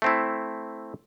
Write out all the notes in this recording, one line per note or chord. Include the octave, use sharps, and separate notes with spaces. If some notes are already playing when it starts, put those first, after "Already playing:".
A3 C4 E4